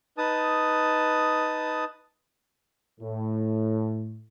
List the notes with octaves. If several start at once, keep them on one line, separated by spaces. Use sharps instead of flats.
D#4 B4 A5 D#6
A2